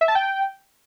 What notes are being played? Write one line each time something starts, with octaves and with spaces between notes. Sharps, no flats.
E5
A5
G5